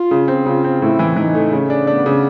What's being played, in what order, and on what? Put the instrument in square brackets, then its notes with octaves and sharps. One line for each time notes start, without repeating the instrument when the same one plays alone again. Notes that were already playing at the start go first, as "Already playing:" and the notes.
Already playing: [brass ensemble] F4
[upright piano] C#3
C4
[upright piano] C#3 [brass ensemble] F4
[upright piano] C4
[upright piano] A2 [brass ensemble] E4
[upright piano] E3
[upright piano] E3 [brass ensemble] D#4
[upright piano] A3
[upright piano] C#3 [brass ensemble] C#4
[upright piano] D4
[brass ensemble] B3 [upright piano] D4
[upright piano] C#3